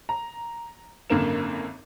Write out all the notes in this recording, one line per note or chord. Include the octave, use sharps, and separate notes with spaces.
A#5
G#1 F#2 D3 A#3 A#4 E7